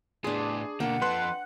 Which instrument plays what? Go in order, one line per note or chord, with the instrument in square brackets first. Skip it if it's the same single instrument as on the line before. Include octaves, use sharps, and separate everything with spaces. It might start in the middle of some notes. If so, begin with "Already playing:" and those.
[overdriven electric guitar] A2 B3 [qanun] D4 C6 [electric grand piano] G#4
[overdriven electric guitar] B2 D3 [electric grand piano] A#3 [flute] F#5 [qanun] G5
[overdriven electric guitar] F3 A4 [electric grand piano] B4 C6 F#6